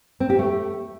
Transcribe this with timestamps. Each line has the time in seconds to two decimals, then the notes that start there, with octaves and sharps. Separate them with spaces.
0.20 C4
0.30 G4
0.39 A3